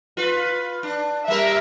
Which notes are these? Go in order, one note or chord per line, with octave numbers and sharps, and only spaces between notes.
F4 B4
D4
G3 A#3 A#4 E5